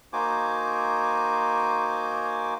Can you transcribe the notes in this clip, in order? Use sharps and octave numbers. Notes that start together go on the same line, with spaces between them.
A#3 D#4 F#4 C5 G#5 D6